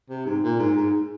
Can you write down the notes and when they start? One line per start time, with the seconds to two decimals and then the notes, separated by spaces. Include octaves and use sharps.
0.10 C3
0.26 G#2
0.43 A#2
0.59 G#2
0.76 G#2